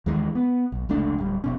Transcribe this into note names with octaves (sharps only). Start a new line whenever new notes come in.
D#2 D#3 E3 G#3
B3
B1
F1 C#2 A3 D4
D1 G3
F1 B2 C#4